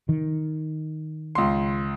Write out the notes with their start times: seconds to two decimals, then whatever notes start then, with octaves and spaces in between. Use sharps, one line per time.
0.09 D#3
1.35 C#2 C6